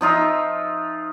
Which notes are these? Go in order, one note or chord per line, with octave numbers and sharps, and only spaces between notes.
F3 D#4 F4 E5